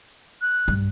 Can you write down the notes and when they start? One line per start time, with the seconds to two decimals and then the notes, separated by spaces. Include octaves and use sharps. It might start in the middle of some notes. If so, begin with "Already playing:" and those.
0.42 F#6
0.68 G2